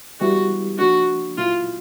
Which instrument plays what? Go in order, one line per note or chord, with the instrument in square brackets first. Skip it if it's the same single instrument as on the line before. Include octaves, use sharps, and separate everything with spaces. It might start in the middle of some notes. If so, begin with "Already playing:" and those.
[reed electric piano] E3 G3 B3 E4 G4 [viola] F#4
[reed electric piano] F3 A#3 D4 [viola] F#4
[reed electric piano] A#2 F#3 B3 E4 [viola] F4